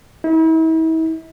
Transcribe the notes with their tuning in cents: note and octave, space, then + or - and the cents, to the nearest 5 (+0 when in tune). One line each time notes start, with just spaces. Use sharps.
E4 -40